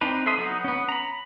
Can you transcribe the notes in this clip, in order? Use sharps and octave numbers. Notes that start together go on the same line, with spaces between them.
C4 D4 D#4 B4
A4 E5 C6 D#6
F#3 B3 D#4
B3 C#4
A#5 B5